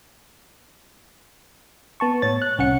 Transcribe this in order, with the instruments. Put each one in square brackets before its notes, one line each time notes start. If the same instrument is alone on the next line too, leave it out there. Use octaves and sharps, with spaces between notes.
[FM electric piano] B3 A5 C#6
A2 C#5 A6
F#6
C2 C#4 F#5 C#7